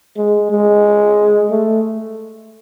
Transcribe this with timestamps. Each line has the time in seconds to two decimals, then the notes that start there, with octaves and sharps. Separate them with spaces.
0.17 G#3
0.51 G#3
1.51 A3